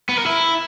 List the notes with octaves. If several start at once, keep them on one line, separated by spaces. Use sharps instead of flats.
B3
A#4
E4